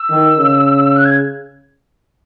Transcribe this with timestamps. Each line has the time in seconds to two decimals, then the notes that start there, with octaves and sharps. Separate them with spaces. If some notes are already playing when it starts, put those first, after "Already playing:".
Already playing: E6
0.10 D#3
0.38 C#3
0.96 F#6
1.05 G#6